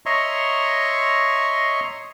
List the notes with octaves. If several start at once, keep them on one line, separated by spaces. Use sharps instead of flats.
C#5 D#5 E5 A#5 C6 C#6